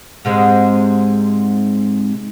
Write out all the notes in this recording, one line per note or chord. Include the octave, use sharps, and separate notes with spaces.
G#2 C3 G#3